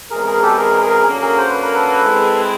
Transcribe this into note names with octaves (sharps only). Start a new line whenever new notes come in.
E2 B2 G#3 C4 G#4 A#4
G#4 A#4
G4 A4
G#4 A#4
G#4 A#4
D3 F#3 A#3 C#4
G#4 A#4
C5
B4
A#4
A4 B4
G#3 C4 E4 G#4